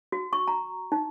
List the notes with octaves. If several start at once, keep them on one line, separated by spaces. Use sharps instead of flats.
F#4
C#6
A#5
D#4